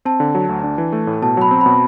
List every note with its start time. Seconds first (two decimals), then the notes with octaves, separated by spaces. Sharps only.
0.05 C4 A5
0.20 D3
0.35 F#3
0.49 D2
0.64 D4
0.78 E3
0.92 A3
1.07 A2
1.22 B2 A5
1.37 F#3 B5
1.51 C4
1.61 B5
1.66 B2